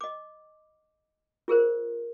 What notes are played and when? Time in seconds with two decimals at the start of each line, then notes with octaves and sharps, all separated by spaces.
0.01 D#5 D6
1.48 F4 G#4 A#4 C5